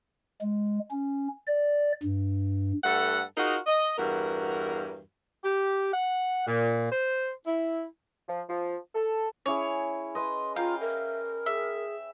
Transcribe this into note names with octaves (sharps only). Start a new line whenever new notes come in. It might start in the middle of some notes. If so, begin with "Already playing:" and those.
G#3
C#4
D5
G2
G2 A3 A4 F#5
D#4 F4 F#4 G#4 A#4
D#5
E2 G2 F#4 A#4
G4
F#5
A#2
C5
E4
F3
F3
A4
C#4 E4 G#4 C#5
B4 D#5 C6
F4 F5 G5 A#5
A#4 E5
G#4 E5